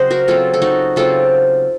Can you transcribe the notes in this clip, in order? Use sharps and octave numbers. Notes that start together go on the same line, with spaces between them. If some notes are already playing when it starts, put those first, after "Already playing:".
Already playing: C#3 F#3 C4 C5 D#5 F#5
F#4 A#4
C#3 F#3 C4 F4 A4
A4
D#4 F#4
C#3 F#3 C4 F4 A4